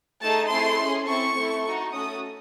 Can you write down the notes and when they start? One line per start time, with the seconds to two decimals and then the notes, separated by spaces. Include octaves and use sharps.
0.22 A3 D#4 G#4 A5
0.50 A3 C4 E4 G#4 C6
0.79 C#4 G#4
1.07 C4 E4 A4 C#6
1.35 A3 C4 E4 A4
1.64 D#4 F#4 A4
1.92 A3 C#4 F#4 A4 D#6